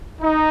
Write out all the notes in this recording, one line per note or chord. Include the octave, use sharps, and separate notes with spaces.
D#4